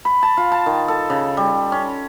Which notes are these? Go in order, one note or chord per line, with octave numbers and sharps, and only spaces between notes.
B5
A5
F4
A5
D#3
A4
C#3
G3
C#4